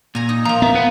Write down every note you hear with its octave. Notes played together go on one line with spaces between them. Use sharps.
A#2 G#5 A#5
D#4
F3 A#3 A#5
B3 E5
B4 F#5